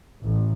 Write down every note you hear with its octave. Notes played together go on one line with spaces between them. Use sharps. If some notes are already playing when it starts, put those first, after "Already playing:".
A1